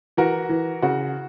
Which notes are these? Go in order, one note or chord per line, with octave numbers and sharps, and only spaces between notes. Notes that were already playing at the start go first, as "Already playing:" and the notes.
E3 F#4 A#4
E3
C#3 F#4